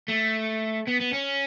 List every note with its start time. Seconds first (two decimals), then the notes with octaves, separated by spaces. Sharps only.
0.08 A3
0.88 B3
1.01 B3
1.14 C#4